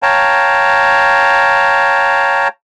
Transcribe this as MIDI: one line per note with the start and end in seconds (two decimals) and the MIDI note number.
0.02 2.48 73
0.02 2.48 77
0.02 2.48 79
0.02 2.48 81
0.02 2.48 82